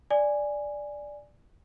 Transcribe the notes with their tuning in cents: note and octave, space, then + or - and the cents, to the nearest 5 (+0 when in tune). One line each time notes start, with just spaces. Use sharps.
D5 +0 G#5 -5